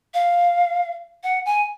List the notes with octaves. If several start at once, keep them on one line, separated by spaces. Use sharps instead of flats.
F5
F#5
G#5